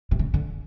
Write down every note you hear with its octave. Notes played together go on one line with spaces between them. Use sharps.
C3
C#3
D3